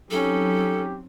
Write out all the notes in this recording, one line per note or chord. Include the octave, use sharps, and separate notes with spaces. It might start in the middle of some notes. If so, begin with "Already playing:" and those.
F#3 C4 C#4 D#4 G4 A4